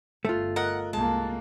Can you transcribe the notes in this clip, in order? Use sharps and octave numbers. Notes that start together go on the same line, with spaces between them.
G1 A3 F4
A#4 D#5 F#5 F#6
C2 G#3 A#3 A5